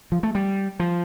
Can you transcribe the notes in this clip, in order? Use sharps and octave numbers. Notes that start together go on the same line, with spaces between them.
F3
A3
G3
F3